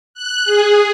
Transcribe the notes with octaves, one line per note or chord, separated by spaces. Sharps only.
F#6
G#4